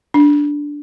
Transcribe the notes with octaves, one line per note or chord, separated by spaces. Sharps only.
D4